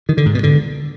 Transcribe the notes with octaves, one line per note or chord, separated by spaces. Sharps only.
D#3
D3
G#2
B2
D3